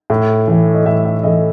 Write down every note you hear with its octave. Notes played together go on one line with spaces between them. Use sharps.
A2
E3 A3
D#5
A2 E5
E5
E3 A3 D#5